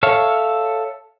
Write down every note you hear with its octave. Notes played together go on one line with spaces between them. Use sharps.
A4 C#5 E5 F5